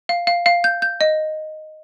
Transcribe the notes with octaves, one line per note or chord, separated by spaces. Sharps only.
F5
F5
F5
G6
G6
D#5